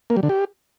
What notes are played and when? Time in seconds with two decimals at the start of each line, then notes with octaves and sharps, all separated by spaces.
0.10 A#3
0.16 G3
0.23 D3
0.29 G4